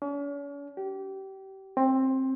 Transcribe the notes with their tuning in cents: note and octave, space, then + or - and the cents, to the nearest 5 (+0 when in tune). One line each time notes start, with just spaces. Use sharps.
C#4 +45
G4 -30
C4 +15